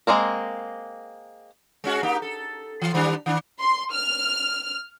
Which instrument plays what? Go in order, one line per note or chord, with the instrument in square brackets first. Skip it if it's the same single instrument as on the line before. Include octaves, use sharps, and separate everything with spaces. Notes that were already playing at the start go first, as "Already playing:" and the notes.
[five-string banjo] G#3 A#3 C4 A#4
[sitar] G#3 C#4 F#4
A#3 D#4 G4
A4
E3
D#3 G3 D4
D#3 D4
[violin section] C6
F6